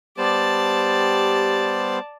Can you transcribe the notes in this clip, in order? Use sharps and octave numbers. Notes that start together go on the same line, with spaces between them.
G3 B3 G4 C5 D5 A5